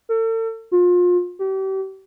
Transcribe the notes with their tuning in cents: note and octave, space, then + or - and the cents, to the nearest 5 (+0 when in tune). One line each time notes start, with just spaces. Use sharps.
A4 +40
F4 +30
G4 -35